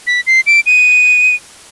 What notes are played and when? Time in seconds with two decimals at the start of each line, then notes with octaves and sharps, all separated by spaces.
0.07 B6
0.27 C7
0.46 D7
0.66 D#7